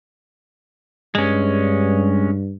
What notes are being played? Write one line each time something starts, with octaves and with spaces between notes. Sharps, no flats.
G2 G#3 C#4